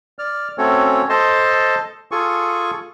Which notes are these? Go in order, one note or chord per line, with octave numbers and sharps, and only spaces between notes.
D5 F6
A3 C4 C#4 F#4 A4 C#5
A4 C5 D#5 A5 C6
F4 G#4 A4 G#5 C#6